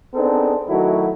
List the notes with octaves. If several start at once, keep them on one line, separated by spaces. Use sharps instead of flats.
B3 C4 D4 D#4 G#4 A4
D#3 F#3 A3 D#4 E4 F#4